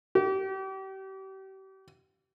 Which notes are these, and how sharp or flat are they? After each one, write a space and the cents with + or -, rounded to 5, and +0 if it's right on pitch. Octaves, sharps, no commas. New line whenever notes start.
G4 -35